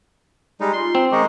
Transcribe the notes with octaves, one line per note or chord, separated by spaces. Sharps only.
G3 G#3 D#4
D#4 F4 C6
C4
D#3 G#3 D#4 C#6 D6